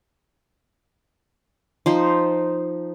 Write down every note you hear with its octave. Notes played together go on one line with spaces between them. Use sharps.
F3 D#4 C5